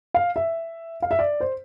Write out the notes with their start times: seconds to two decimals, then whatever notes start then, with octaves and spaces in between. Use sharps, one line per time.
0.14 F5
0.36 E5
1.02 F5
1.11 E5
1.19 D5
1.40 C5